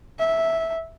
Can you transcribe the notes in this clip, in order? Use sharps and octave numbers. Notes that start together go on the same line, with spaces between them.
E5